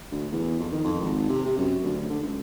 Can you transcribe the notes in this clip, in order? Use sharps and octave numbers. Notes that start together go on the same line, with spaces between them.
D2
E2
F2
D#3
F2
G#1
C3
C3
F#2
D2
D3
C#2